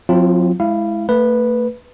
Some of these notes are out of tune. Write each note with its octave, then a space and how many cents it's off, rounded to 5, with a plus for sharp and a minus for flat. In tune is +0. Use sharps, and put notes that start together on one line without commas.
F3 +45 C4 -10 F4 -25
G#3 +10 E4 +0 F5 -25
A3 +35 B4 -5